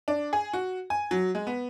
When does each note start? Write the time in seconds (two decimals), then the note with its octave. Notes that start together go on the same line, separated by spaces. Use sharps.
0.08 D4
0.33 G#4
0.53 F#4
0.90 G#5
1.11 F#3
1.35 G#3
1.47 B3